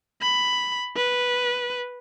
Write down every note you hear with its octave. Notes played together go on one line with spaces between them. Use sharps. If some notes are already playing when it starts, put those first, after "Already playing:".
B5
B4